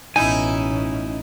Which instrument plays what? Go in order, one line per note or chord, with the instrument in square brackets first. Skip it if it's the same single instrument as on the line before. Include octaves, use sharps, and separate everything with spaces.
[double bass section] A1 B2 [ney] C#4 [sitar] D#4 E4 [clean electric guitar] G#5